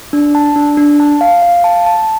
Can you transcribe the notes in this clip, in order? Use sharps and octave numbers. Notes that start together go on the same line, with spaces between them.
D4
A5
D4
D4
A5
F5
F5
A5
A5